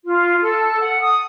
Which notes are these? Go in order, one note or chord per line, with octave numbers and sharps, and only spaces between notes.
F4
A4
F#5
D#6